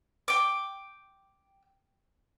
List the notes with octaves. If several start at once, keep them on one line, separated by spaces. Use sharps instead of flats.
G5 D6